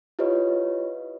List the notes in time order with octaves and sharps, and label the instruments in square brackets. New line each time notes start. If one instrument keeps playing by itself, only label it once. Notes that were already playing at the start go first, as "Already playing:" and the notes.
[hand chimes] E4 F4 G4 B4 C#5 D#5